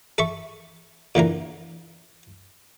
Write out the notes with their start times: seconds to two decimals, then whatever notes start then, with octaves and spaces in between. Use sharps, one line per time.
0.18 A4 E5 C#6
1.15 A#2 D3 E3 A#4